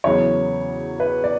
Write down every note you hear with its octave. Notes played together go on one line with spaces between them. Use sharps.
E2 C#3 F#3 B3 C#5
B4
D5